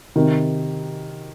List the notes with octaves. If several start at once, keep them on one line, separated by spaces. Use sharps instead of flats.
C3 D#3